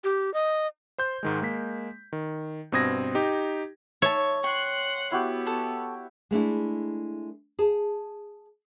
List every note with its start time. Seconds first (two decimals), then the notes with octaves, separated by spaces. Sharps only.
0.04 G4
0.34 D#5
0.98 C5 C6 G6
1.23 G#2 D#3 G#3
1.42 G#3 A#3 B6
2.13 D#3
2.72 G2 B2 C4 D#6 G#6 A#6
3.15 D#4 G4
4.02 C#5 E5 A5
4.44 F#5 G5 C6 C#6 F#6
5.12 B3 E4 F#4 G4
5.47 A4
6.31 G#3 A3 D4 E4
7.59 G#4 A5